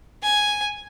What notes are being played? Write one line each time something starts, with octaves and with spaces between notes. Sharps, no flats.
G#5